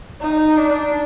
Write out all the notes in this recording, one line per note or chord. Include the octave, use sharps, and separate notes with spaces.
D#4
D4